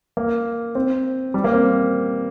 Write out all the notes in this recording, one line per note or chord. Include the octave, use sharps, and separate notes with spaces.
A#3
C4
G3
A#3
C4